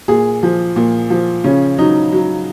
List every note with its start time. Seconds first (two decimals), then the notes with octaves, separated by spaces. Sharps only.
0.08 A#2 G#4
0.43 F3
0.76 A#2
1.10 F3
1.44 C#3 C#4
1.78 F#3 D#4
2.12 F#3